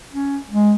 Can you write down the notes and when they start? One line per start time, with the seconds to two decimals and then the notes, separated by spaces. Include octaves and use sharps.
0.14 C#4
0.50 G#3